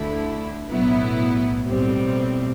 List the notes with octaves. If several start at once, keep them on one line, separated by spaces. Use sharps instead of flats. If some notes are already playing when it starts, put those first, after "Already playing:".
Already playing: D2 D3 A3 E4
B1 A2 F#3 B3 E4
B1 A2 G3 C4